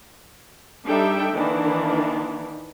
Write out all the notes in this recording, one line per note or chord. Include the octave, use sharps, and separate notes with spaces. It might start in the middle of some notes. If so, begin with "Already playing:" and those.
G3 D4 D#4 A4 E5 G5
D#3 E3 A#3 D4